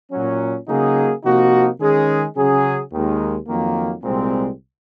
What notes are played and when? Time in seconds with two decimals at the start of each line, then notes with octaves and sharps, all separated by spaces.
0.12 A#2 F#3 C#4
0.68 C#3 F#3 A#3 D#4 G#4
1.24 C3 F3 A#3 D#4 F#4
1.79 D#3 G#3 C#4 G#4
2.36 C#3 F#3 C#4 G#4
2.92 D#2 D#3 G#3
3.48 F2 D#3 F#3 A#3
4.03 C2 A#2 G#3 C4